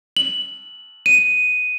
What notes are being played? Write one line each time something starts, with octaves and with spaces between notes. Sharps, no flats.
F#7
D#7